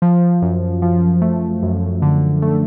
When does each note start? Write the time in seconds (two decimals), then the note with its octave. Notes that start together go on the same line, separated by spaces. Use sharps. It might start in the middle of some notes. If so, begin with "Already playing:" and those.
0.02 F3
0.42 F#2
0.82 F3
1.21 A3
1.63 F#2
2.02 D3
2.42 A3